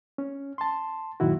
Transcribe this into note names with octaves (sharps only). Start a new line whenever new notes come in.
C#4
A5 C6
F#2 A#2 D#3 E4 F#4